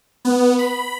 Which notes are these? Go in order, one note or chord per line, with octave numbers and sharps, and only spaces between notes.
B3
B5